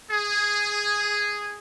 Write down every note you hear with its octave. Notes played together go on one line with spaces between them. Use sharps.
G#4